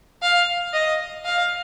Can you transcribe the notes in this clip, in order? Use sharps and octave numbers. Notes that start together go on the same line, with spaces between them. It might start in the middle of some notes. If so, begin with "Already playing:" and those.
F5
D#5
F5